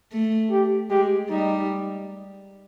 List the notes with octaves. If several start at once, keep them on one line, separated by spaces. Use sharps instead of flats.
A3
G4
G#3 G4
G3 D#4